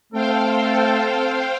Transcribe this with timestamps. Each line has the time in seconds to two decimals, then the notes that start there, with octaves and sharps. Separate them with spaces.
0.13 A3 C4 A4 C5 F5 G5